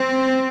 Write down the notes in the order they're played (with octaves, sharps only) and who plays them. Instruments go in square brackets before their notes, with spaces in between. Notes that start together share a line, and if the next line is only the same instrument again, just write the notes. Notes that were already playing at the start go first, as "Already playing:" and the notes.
Already playing: [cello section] C4